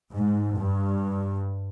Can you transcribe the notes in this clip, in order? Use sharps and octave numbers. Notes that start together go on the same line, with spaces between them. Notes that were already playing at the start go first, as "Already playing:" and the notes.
G#2
G2